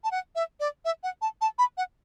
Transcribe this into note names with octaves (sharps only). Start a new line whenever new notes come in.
A5
F#5
E5
D5
E5
F#5
A5
A5
B5
F#5